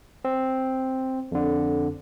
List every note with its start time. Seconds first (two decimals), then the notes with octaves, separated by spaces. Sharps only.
0.25 C4
1.32 F2 D3